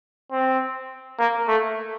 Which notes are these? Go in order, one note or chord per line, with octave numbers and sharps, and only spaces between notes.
C4
A#3
A3